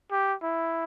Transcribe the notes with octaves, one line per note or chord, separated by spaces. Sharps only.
G4
E4